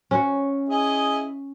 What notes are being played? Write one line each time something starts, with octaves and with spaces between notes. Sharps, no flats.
C#4 F#4
E4 G#4 D#5